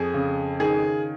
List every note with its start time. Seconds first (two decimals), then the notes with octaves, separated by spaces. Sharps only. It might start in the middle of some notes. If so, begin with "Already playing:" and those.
Already playing: F2 G#4
0.14 C#3
0.60 D#3 G#4